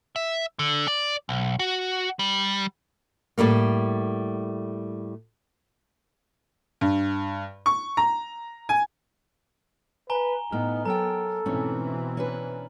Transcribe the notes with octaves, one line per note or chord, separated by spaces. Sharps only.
E5
D3
D5
B1
F#4
G3
A2 G3 A3 A#3
G2
C#6
A#5
G#5
B4 G#5 A#5 G7
A2 B3 D#4 F6
F#3 A4 A#4 G5 A#5
G#2 B2 E3 A3 C4 C#4
C#4 D4 B4